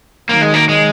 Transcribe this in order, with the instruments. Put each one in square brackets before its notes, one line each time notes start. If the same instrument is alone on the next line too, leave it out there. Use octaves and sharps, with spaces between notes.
[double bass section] D#3 F#3 [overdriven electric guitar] A#3
[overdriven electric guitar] G#3
A#3
G#3